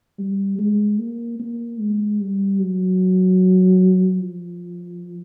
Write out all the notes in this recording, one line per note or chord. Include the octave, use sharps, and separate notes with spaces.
G3
G#3
A#3
A#3
G#3
G3
F#3
F3